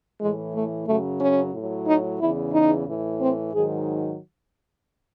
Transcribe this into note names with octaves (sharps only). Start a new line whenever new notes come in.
A2 E3 G#3
A3
F#2 C#3 F#3 A3
C#4
A2
F#3
D#4
E2 C#3 E3 E4
D#4
A2 E3
C4
G#2 D#3 F#3 G#4